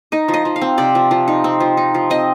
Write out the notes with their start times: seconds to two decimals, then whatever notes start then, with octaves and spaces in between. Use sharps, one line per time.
0.12 D#4 D#5
0.28 F3
0.34 D#5
0.45 F3
0.56 F5
0.61 C4
0.78 C3 D5
0.95 F3
1.11 F3
1.28 D#4
1.44 C4
1.60 F3
1.77 D#4
1.94 F3
2.10 C4 D#5